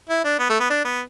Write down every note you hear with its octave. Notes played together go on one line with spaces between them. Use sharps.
E4
D4
B3
A3
B3
D4
B3